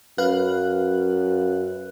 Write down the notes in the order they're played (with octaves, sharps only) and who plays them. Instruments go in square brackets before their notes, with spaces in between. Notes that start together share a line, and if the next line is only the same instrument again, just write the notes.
[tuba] F#2 [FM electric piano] B4 F5 F#6